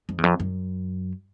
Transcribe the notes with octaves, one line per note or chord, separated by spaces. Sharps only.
F2
E2
F2
F#2